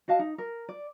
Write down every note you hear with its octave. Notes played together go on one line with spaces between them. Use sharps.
F#4 D#5 F5 A5
D#4
A#4
D5